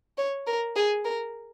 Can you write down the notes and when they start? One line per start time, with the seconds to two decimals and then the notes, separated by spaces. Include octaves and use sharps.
0.18 C#5
0.47 A#4
0.76 G#4
1.05 A#4